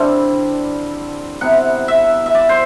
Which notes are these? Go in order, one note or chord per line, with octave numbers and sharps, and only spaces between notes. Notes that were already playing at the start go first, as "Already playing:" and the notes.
Already playing: D3 G3 C4 E4
C3 G3 B3 E4 F#5
E5
E5
D5
C5